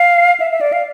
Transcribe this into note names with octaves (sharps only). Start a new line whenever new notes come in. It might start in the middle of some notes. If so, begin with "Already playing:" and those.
Already playing: F5
E5
E5
D5
F5